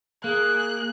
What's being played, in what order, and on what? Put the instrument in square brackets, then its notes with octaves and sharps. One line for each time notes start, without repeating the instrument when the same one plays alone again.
[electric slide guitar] A#3 [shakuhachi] G#4 [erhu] F#6